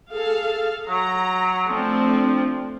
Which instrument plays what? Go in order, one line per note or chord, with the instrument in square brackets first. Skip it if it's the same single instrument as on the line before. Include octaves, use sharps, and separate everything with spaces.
[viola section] G#4 A4 F5
[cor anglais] F#3 [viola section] A#5
[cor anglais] F3 [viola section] A3 C4 D4